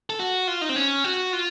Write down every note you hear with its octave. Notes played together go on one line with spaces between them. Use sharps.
A4
F#4
F4
D#4
C4
C#4
F#4
F4